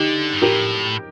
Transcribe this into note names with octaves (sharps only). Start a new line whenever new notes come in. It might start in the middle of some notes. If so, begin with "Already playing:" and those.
Already playing: D3 D#4 G4
G2
A2 G4 A#4